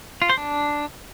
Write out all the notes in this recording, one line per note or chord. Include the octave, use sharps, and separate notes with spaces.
F4
C5
D4